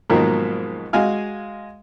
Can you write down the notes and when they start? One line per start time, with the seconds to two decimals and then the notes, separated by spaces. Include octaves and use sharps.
0.10 G#2 B2 D#3 F3 F#3 A#3
0.93 G#3 F#4 F5 G#5 F6